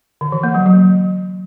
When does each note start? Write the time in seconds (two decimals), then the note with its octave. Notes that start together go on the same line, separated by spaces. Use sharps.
0.21 D3
0.32 E3
0.43 A#3
0.55 F#3
0.66 F#3